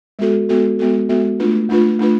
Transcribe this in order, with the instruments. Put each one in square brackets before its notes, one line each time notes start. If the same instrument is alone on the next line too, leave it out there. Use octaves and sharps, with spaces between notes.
[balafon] G#3 B3 F#4 A4
G#3 B3 F#4 A4
G#3 B3 F#4 A4
G#3 B3 F#4 A4
A3 D4 F4 B4
A3 D4 F4 B4
A3 D4 F4 B4